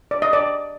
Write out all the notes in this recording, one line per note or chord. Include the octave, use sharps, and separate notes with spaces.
D5
D#5
D5